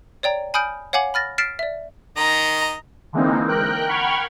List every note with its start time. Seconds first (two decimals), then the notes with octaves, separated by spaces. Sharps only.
0.23 C#5 D5 G5 A#5
0.54 G#5 B5 D#6 F6 G6 D7
0.93 C#5 F5 F#5 G#5 D6 F#7
1.14 B5 F6 A6 A#6
1.38 F6 A6 B6 C7 D7 E7
1.59 D5 E5
2.17 D#3 D#5 A#5
3.13 D3 E3 G#3 A#3 C4 D#4
3.47 A#4 G5 F#6
3.88 F#5 G5 B5 C#6 F6 G#6